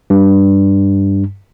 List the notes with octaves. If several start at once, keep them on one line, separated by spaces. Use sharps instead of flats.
G2